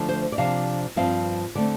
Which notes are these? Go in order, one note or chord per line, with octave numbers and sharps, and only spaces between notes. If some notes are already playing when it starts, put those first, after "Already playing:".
Already playing: D3 F3 A3
C5
D5
C3 F3 D4 F5
G2 F3 C4 F5
D3 A3 C4 D5